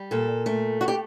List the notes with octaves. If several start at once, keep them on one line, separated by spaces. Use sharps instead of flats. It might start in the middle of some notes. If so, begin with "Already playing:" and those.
Already playing: G3
A#2 A4
A3
F#4
G4